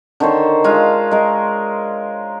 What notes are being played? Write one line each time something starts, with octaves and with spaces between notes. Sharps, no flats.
D3 D#3 C5 C#5
G#3 F4 E5 F5
G#3 A#4